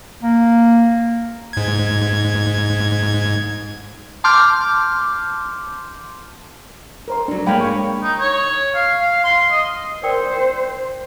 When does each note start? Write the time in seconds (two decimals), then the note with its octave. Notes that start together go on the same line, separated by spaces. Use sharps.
0.22 A#3
1.53 G#2 G#6
4.24 A5 C6 D6 F6 G6
7.08 A#4 C5 C6
7.28 F#3 D4 A4 A#4
7.46 G#3 A#3 C#5 F5 G5 B5
7.61 C#6
8.03 D#4
8.20 C#5
8.75 F5
9.00 F5
9.24 C6
9.52 D#5
10.03 A#4 C5 D5 G5